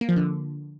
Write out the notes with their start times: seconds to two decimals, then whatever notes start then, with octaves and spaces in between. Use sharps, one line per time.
0.01 A#3
0.09 F3
0.16 D3